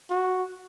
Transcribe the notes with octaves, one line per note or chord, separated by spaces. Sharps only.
F#4